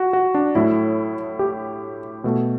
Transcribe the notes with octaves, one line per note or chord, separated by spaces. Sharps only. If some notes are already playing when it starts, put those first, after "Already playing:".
Already playing: F#4
F#4
D4
A2 F#3 A3 E4
G4
B2 A3